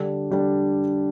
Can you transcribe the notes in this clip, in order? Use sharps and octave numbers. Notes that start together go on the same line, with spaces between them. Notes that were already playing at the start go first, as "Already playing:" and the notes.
Already playing: D3 G3 D4
D3 G3 D4